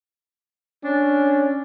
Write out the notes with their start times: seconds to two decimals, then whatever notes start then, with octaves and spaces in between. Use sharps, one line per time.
0.84 C#4 D4